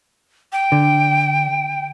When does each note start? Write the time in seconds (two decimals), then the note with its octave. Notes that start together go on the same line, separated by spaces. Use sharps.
0.53 G5
0.72 D3